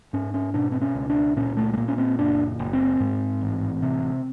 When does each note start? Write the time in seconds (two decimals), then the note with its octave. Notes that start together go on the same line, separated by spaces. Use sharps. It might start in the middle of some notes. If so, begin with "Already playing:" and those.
0.13 G#2 C#4
0.34 C#4
0.54 B2 D4
0.72 C4
0.81 C#4
0.95 C#2
1.10 D4
1.37 A#2 C#4
1.57 A3
1.73 A3
1.77 A#2 A#3
1.88 C#4
1.98 C4
2.18 F#1 D4
2.59 F#1
2.73 C4
3.00 G#2
3.41 A1
3.82 C3